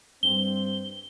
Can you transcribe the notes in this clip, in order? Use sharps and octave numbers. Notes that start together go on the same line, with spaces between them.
G2 C4 G7